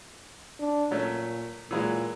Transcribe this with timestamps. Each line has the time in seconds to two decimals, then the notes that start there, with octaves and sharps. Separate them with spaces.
0.60 D4
0.91 A#2 F#3 A3 C#4
1.71 A#2 E3 F#3 G#3